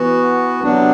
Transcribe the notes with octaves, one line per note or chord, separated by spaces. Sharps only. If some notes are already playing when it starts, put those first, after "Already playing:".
Already playing: E3 B3 F#4
C3 F#3 B3 D4